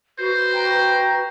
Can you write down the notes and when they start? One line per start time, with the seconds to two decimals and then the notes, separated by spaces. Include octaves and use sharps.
0.19 F#4 B4 C5
0.55 G5 A#5